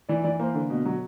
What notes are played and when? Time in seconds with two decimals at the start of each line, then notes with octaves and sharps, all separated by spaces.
0.09 E3 D5
0.23 E3 D5
0.39 A#3 C5
0.54 D3
0.70 B2
0.85 F#3